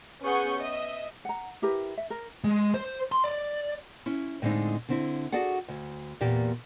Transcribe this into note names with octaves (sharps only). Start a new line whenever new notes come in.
B3 C#4 G#4 F#5 C#6 G6
D#5 E5
F#5 A#5
E4 G4 A#4 B4
E5
A#4
G#3
C5
C6
D5
C#4 E4
A2 D3 G#3 C4 D#4
D3 C4 E4
F#4 G#4 A4 D5 F#5
D2
E2 A#2 A#3 G4